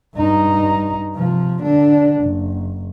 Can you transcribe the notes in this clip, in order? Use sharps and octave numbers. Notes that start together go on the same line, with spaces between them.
G2 D#4
C3 F3
D3 D4
F#1